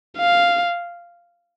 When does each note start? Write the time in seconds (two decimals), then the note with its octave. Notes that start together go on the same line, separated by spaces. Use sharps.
0.18 F5